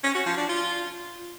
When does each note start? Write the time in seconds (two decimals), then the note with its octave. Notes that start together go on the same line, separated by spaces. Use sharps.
0.03 C#4
0.15 F#4
0.26 F3
0.38 D4
0.49 F4